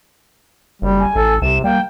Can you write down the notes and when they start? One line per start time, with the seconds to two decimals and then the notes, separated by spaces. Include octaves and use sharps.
0.82 F#1 G3
1.00 G#5
1.16 A1 A4
1.42 C2 C3 E7
1.64 G3 A#3 G5